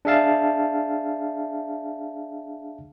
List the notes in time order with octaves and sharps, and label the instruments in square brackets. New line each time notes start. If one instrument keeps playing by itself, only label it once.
[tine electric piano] D4 G#4 E5 F5 A5